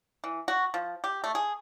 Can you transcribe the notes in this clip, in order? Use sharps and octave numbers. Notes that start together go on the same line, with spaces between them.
E3
F#4
F3
G4
A3
G#4